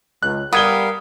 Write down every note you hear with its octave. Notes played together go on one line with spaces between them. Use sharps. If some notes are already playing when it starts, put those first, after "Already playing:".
C#2 F#6
G3 B3 A#4 F5 D#6 G#6 G7